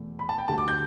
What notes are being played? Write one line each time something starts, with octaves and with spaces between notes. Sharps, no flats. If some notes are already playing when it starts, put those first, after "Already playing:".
Already playing: E2 B2 A3
B5
A5
G5
D2 D3 G3 A5
D6
G6